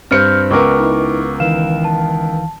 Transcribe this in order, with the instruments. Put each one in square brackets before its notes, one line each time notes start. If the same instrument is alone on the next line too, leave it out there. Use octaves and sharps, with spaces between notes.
[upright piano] G2 C4 C#7 [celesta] F6 G6
[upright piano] C#2 B3 A#4 [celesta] C#6 D6 F6
[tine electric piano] D#4 E4
[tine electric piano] D#3 E3 F5 [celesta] E7
[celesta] A5